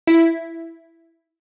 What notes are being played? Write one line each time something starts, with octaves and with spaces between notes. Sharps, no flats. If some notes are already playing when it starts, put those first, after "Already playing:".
E4